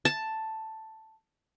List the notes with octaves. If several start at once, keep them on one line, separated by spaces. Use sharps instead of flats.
A5